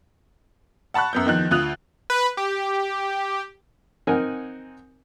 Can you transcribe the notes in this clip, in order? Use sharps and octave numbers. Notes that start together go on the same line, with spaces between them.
F#5 A5 B5 C#6 F#6
F#2 B3 G6
E2 D#3 F3 F#6
D2 F4 D#6 F#6 F7
B4
G4
C4 D#4 A#4 F#5 G#5